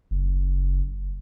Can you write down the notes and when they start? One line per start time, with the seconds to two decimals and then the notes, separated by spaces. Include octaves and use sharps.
0.11 F#1